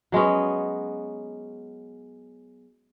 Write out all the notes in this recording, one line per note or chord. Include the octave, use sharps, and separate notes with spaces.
F#3 G#3 B3 C#4